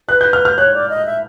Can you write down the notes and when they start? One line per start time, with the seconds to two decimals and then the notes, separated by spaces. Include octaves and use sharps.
0.09 B4 F#6
0.21 G6
0.33 F6
0.45 F6
0.57 C#5 F#6
0.74 D5
0.90 D#5
1.06 E5